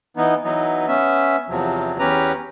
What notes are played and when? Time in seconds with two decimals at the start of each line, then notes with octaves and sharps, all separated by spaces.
0.17 E3 B3 D#4
0.44 E3 F#3 B3 D#4
0.88 B3 C#4 E5
1.49 E2 C3 F3 F#3
1.99 E2 C#4 G4 B4 A#5